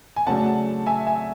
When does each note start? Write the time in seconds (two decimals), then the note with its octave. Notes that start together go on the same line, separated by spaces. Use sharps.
0.16 G#5
0.27 C#3 F#3 A3 D4 F#5 A5
0.86 E5 G#5
1.07 E5 G#5